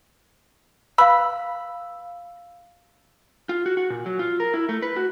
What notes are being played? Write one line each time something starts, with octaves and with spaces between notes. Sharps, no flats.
B4 F5 B5 E6
F4
F#4
F#4
A#2
F#3
F4
A#4
E4
A3
B4
F#4